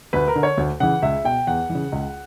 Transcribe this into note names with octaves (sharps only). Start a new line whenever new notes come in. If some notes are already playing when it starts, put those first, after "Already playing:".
D2 B4
A#4
D3
C#5
D2
C#3 E3 F#5
C#2 E5
B2 G5
E2 F#5
E3
C#3
C#2